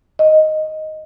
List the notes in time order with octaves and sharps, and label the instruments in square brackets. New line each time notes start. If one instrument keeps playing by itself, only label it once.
[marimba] D#5